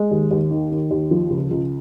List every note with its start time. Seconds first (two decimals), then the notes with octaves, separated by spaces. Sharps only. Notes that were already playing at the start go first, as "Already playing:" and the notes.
Already playing: G#3
0.11 D#2
0.31 D#2
0.51 D#3
0.71 D#3
0.91 D#2
1.11 F3
1.30 C#2
1.51 C#2